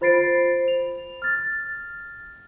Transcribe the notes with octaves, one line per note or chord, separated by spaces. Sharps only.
F4 C5 B5 A6 C7 D7
F7
F6 A6